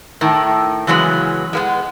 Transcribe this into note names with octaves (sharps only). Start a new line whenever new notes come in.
A2 D#3
C#3 E3 F#3 G#3 B3
G#3 A#3 B3